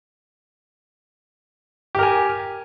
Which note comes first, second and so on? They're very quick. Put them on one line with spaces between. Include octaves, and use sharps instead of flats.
G4 A#4 G#5